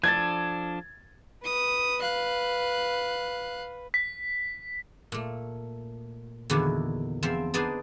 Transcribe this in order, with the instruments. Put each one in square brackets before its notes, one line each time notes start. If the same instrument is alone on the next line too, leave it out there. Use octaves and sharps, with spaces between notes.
[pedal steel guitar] F3 D4 A4 [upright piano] G#6 A6
[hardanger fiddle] B4 [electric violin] D#6
[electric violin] F5 F#6
[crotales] B6
[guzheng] A#2 A3
E2 A#2 D3 D#3 E4 F#4
E2 F3 C4 C5 E5
B3 D4 D#4 G#4 C5 D5